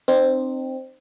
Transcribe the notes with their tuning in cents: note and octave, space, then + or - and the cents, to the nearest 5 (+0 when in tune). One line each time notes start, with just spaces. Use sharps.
C4 +0 D#4 -40